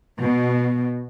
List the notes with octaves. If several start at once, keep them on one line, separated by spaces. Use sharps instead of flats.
B2